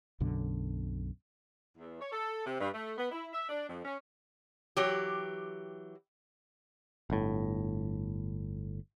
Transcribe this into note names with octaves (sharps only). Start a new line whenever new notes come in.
B1 F#2 B2 D3
E2
C#5
A4
C3
G2
A3
B3
E4
E5
D4
F2
C#4
E3 F#3 G4
G1 A2